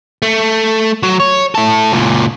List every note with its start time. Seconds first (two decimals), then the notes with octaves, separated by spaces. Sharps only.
0.22 A3
1.03 F#3
1.20 C#5
1.55 E4 A4
1.92 C#2 A#2